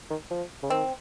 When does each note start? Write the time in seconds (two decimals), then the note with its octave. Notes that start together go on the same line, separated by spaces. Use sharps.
0.10 D#3
0.30 F3
0.63 C#3
0.70 D#3 C4